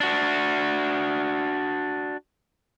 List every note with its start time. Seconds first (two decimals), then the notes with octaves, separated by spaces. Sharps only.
0.01 D4 F#4